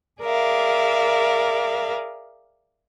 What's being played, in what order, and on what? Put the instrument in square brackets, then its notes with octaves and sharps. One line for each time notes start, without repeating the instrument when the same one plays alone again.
[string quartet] G#4 A#4 D5 E5 F5